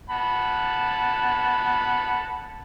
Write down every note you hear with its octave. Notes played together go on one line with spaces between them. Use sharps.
F#5 A5 B5